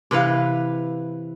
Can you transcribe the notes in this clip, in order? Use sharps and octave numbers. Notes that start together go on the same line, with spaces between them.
C3 E3 B4 F5